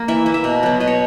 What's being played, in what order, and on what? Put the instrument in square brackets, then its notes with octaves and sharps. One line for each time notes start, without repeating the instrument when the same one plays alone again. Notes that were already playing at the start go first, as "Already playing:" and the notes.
Already playing: [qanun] A#3
E3 E5
A#3
E5
B2
F#3 B3
B2 D#5
C#5